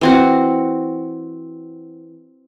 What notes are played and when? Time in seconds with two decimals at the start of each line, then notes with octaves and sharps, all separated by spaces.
0.01 E3 C4 F#4